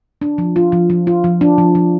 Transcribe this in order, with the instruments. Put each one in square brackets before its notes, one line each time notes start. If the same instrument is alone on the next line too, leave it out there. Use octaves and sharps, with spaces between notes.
[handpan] D4
F3
F4
F3
F3
F4
F3
D4
F3
F3